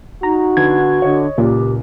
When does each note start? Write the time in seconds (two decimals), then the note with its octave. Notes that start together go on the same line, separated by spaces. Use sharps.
0.23 D#4 F#4 A#5
0.57 D3 B3 G#6
1.02 D3 C#5 D#5
1.38 C#2 A#2 G4